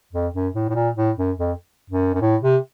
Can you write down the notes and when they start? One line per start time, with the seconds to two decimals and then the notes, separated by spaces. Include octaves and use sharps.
0.13 F2
0.34 F#2
0.54 A2
0.70 A2
0.75 A#2
0.96 A2
1.17 F#2
1.38 F2
1.90 F#2
2.14 F#2
2.21 A2
2.42 C3